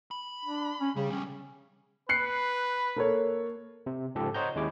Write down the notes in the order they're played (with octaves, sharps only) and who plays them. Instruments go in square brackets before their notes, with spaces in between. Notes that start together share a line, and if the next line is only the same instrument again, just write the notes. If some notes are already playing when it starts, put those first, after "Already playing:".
[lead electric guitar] B5
[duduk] D4
C#4
[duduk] C#3 [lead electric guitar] G3
[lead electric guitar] C#3 G3 [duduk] C#4
[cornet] B4 [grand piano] F#6 C7 C#7
[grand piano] A#3 A4 C#5
[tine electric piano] C3
G#2 C#3 F3 G4 A4
C5 C#5 D#5 F#5 A#5 G6
D#2 G#3 C#4 E4 C#5 D6